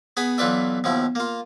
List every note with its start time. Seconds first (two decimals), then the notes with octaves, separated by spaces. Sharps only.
0.17 B3 G#4 B5
0.38 B1 E3 F4 B4 D5 E5
0.84 D#2 B2 F3 E4
1.15 A#3 F4